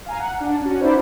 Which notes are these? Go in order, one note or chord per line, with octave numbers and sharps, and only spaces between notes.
F5 G#5 A#5
F#5
D4
C#4 F#4
D#4 E4 B4 C5 D5